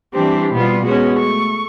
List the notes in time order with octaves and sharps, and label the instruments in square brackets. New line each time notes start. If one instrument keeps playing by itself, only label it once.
[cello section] E3 G3 C4 [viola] D4 G4
[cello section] B2 G3 F4 [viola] B3
[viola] G#3 C#4 [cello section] B3 F#4
[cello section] A3 [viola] C#6